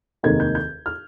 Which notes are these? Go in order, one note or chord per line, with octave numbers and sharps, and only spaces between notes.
F1 D#2 D#3 G#3 G#6
G6
G6
F6